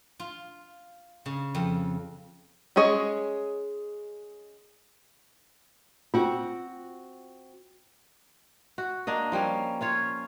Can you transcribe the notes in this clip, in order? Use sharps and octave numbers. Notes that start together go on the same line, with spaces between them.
F4
C#3
F2
G#3 C#4 G#4 C#5 D#5
C4 F4 F#4
F#4
A#3 D4 D#5
F3 G3 A#3 C#4
C#4 F4 C#5